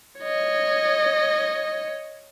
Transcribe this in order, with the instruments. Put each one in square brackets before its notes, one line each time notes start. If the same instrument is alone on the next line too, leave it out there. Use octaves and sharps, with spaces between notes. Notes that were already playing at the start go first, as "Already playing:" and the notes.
[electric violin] C#5 D#5